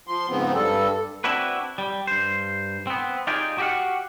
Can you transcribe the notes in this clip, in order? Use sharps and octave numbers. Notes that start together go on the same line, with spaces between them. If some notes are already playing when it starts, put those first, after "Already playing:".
F3 C6
G#2 C#3 F3 B3 C4
G2 G3 A4
C4 D4 E4 F#4 B4
G3
G2 C5
B3 C4
D#4 F4 G4 G#4 D5
F#4 G4 D5 F5 F#5